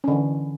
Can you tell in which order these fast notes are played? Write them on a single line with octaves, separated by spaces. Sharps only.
C#4 D3 E3